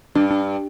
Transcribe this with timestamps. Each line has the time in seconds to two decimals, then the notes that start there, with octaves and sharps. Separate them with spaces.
0.15 G2 D4
0.31 D4